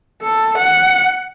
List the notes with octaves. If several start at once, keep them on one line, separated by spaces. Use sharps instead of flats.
A4
F#5